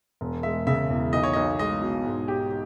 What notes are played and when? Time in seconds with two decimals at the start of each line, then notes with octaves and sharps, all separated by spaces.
0.21 E1
0.43 G#3 E5
0.67 C#3 E5
0.90 E2
1.13 B1 D#5
1.23 C#5
1.33 B1 D#5
1.59 G#3 D#5
1.82 B2
2.05 G#2
2.28 G4